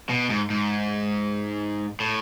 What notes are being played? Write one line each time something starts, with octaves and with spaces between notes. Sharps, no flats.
B2
G#2
G#2
A2